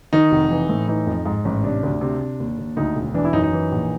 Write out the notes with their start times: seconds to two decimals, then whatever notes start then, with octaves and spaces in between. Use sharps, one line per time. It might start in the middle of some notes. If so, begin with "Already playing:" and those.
0.13 D#3 D#4
0.31 F1
0.51 E3
0.69 A2
0.88 E3 D#4
1.07 F2
1.26 G#2
1.45 A1
1.64 C3 D4
1.83 D2
2.01 C3
2.21 C3
2.40 D#2
2.58 D#2
2.77 D2 D#4
2.96 E1
3.14 E3 D4
3.25 E4
3.33 F#2 D#4
3.43 D#4
3.53 E3
3.72 A#1